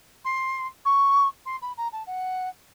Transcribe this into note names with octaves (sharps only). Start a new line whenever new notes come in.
C6
C#6
C6
B5
A#5
A5
F#5